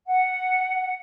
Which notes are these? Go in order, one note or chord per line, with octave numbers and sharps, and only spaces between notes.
F#5